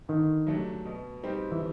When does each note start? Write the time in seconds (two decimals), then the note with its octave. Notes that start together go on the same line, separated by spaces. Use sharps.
0.08 D3 D#3
0.47 F#3 A3 D4 G4
0.85 B2
1.23 G3 C4 D#4 G4
1.52 E3